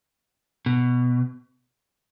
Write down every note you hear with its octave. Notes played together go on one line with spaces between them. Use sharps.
B2